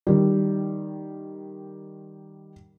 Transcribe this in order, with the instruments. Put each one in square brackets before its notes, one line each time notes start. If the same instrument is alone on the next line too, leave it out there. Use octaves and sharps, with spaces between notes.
[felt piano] D#3 G3